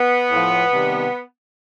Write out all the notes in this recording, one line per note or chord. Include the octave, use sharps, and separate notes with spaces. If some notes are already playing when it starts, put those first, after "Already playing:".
Already playing: B3
A2 F3
C3 D#3 G3